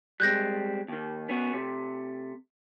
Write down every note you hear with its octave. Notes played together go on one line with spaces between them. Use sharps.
G3 G#3 C4 F#6 G6 A#6
D#2 D#3
B3 C#4 F#4
C3 A3